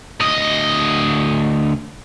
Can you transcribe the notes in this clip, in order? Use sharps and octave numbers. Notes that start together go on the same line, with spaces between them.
D2 D#5